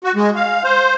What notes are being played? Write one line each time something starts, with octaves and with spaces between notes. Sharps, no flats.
F#4
G#3
F5
C5